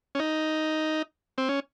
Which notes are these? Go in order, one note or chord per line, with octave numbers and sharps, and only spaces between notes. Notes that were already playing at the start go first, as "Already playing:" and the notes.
C#4
D#4
C4
C#4